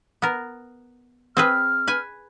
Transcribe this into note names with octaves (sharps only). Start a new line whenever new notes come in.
B3 A#4
C4 G#4 B4 F6
B4 G#5